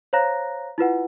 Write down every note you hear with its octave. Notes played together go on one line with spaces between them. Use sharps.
C5 C#5 F5 A#5 F#6 A#6
E4 F4 B4 F#5